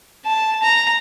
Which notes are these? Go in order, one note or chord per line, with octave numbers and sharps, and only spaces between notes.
A5
A#5